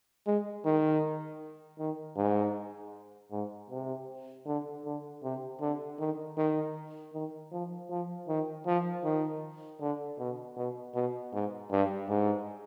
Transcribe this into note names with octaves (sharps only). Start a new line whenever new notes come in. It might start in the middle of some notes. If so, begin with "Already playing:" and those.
G#3
D#3
D#3
G#2
G#2
C3
D3
D3
C3
D3
D#3
D#3
D#3
F3
F3
D#3
F3
D#3
D3
B2
B2
B2
G#2
G2
G#2